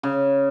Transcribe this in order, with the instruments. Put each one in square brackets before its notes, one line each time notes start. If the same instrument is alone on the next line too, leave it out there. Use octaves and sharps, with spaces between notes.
[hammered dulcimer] C#3